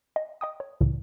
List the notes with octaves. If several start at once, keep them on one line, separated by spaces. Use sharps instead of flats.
D#5
D#5 G5 D#6
C#5
C#2 A2 C#3 E3